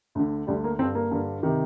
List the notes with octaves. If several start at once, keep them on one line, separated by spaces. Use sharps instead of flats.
D2 D3
D2 D3 G3
A#3
G2 D3 C4
A#3
G2 D3
C3 D#3